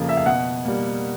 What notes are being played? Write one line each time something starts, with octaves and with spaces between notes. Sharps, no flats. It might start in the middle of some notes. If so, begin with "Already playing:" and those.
Already playing: F2 C#3 F3 A#3
E5
F5
B2 F#5
G3 A#3